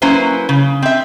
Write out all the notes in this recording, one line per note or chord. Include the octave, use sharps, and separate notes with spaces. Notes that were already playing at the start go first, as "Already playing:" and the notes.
F#3 A#3 C#4 E4 B4 C5
C#3
C4 E5